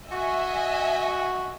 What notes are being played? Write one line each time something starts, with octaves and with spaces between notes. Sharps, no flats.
F#4 D#5 E5 G#5